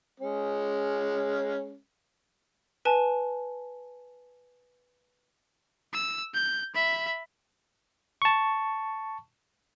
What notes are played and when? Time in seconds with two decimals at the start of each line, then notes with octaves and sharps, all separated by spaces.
0.20 G#3 C#4
2.85 B4 G#5 A5
5.93 E6
6.34 G6
6.75 E5 B5
8.22 A5 C#6